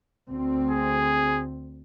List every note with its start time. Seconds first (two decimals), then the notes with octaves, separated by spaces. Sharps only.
0.29 D2 C4
0.71 G#4